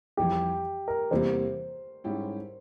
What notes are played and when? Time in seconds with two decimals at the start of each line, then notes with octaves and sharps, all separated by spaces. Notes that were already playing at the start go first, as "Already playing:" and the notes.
0.17 F2 E3 G3 G4
0.88 A#4
1.11 E2 C3 E3 G3 A#3 C5
2.04 G#2 G3 C#4 E4 G4